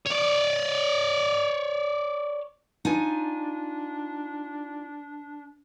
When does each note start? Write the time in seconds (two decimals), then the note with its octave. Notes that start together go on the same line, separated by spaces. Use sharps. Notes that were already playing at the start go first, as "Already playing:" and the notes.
0.07 C#5 D5
2.85 D4 D#4 F4 G#5